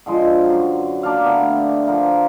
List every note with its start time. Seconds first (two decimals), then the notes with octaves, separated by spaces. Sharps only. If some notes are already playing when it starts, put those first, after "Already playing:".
0.06 D3 F3 G#3 C6
0.45 F#2 F#3
1.03 A#3 D4 D5 F5
1.25 D3 A3 B3 D4
1.87 F3 F4 A#4